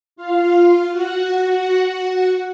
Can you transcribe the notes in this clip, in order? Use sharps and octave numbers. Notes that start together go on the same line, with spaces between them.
F4 F5
F#4 F#5